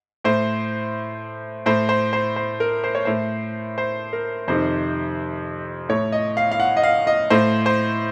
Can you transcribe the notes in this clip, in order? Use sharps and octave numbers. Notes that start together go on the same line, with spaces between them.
A2 C5
A2 C5
C5
C5
C5
A#4
C5
C#5
A2 C5
C5
A#4
F2 C3 D#3 C5
A2 C#5
D#5
F5
F5
F#5
D#5
F5
D#5
A2 C5
C5